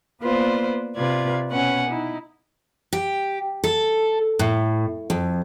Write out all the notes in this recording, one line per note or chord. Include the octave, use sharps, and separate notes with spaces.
A#3 B3 F4 B4 C5 D5
C3 F4 B4 D5 G#6
B2 C#4 B4 F#5 G#5
D#4 E4
G4
A4
A2
F2